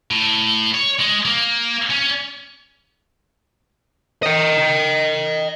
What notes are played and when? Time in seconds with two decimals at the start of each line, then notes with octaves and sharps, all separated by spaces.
0.11 A2
0.74 C#5
1.00 G#3
1.25 A#3
1.90 C#4
4.23 D#5 G5